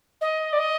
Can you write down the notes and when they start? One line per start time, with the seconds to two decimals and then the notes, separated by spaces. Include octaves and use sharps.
0.21 D#5
0.52 D5
0.58 D#5